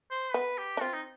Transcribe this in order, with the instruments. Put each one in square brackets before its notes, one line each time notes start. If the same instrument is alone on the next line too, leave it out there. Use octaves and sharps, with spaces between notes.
[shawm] C5
[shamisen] B3 [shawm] B4
[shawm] G4
[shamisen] D4
[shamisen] C4 [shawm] F4
[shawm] D#4